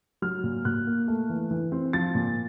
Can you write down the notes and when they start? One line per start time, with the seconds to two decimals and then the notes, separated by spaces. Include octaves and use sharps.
0.22 F#3 F6
0.43 A#2
0.65 A#2 F#6
0.87 A#3
1.08 A3
1.30 E3
1.51 E3
1.72 C4
1.93 F3 A6
2.15 A#2